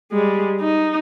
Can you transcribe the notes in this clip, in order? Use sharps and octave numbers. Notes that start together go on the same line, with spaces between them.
G3 G#3
D#4